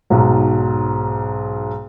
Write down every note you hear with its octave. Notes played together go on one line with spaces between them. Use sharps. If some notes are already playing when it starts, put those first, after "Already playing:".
B1 G#2 F#3